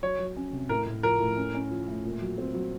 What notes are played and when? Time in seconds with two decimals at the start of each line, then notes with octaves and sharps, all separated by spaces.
0.02 F#3 C#5
0.19 F#3
0.36 C#4
0.53 C3
0.69 A2 A#4
0.87 A2
1.03 F3 A#4
1.20 A2
1.37 C#4
1.54 C#4
1.70 F3
1.88 A3
2.05 A#2
2.21 F#3
2.38 C4
2.54 F#3